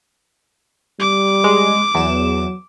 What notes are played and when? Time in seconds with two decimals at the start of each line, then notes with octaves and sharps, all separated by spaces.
1.00 G3 D6
1.44 G#3
1.95 E2 F#3 E7